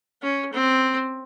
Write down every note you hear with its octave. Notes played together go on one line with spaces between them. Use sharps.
C#4
C4